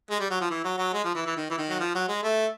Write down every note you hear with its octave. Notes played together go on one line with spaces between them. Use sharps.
G#3
G3
F#3
F3
E3
F#3
F#3
G#3
F3
E3
E3
D#3
E3
D#3
F#3
F3
F#3
G#3
A3